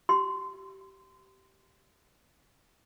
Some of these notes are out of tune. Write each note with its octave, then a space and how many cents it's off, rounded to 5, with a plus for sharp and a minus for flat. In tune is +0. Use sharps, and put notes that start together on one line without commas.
G4 -25 C6 -25